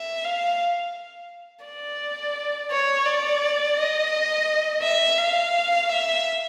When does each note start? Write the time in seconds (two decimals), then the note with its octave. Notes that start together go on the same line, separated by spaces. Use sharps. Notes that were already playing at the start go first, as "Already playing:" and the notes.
Already playing: E5
0.24 F5
1.65 D5
2.71 C#5
3.06 D5
3.77 D#5
4.83 E5
5.18 F5
5.89 E5